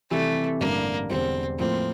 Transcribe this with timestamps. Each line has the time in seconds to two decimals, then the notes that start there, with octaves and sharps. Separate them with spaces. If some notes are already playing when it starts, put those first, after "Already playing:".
0.11 C3 E3 G3 A3
0.60 A1 G2 D3 G3 A#3 D4
1.10 E1 E2 D3 G3 C4
1.59 A2 F3 A#3 C4